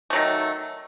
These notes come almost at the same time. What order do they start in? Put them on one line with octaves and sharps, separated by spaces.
A3 F#3 D#3